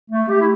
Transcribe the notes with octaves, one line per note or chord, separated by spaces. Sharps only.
A3
G4
E4